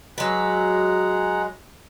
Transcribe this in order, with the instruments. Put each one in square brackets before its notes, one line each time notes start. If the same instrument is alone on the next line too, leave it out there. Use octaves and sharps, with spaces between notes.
[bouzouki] F#3 B4 [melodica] G#3 [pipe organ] G#4 F#5 A#5